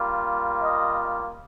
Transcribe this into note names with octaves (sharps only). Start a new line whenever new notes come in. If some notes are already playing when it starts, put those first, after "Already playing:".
Already playing: G3 A#3 F4
D#5